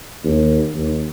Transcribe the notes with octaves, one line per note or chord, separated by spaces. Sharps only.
D#2
D#2